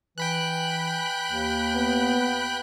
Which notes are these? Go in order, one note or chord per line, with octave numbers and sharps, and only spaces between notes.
E3 G5 B5 F#6
D#2
B3